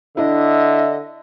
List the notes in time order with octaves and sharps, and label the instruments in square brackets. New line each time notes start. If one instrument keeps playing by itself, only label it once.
[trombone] D3 [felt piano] D4 E4 [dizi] D#5 [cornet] E5